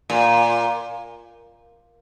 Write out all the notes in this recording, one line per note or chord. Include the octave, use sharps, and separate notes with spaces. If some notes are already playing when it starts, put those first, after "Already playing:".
A#2